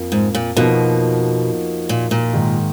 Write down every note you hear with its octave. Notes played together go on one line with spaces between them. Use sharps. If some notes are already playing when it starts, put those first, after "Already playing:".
Already playing: F2 F3 A#3
G#2
A#2
B2 F3 A#3 D#4 F#4
A#2
A#2
G#2 D#3 A#3